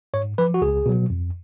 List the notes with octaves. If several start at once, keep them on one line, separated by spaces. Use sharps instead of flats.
G#2 C#5
F3 B4
F#4
C#2 G#4
B2 F#3
F2